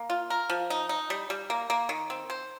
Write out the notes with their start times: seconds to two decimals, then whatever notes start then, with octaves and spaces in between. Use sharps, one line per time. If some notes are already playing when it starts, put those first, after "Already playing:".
Already playing: A#3
0.10 F4
0.30 A#4
0.50 F3
0.70 D#4
0.89 D#4
1.10 G3
1.30 G3
1.50 A#3
1.70 A#3
1.89 D#3
2.10 C4
2.30 C5